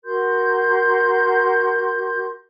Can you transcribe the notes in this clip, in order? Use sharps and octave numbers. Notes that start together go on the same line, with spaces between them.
F#4 A#4 C6 G6